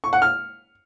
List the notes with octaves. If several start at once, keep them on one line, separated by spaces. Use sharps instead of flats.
C#6
F#5
F6